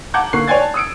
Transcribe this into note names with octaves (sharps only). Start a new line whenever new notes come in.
F#5 A5 A#5 D6 G6 G#6
D3 A#3 C#6 F#6 C7
C#5 D5 G5 G#5 G#6 A6
A5
D#6 E6 C#7 D7